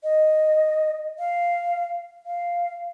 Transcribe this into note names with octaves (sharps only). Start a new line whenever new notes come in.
D#5
F5
F5